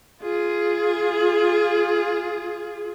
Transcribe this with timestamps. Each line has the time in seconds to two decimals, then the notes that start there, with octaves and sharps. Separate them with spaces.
0.23 F4 G#4